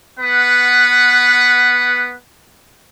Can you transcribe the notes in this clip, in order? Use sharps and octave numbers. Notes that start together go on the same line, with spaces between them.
B3 B4 F#5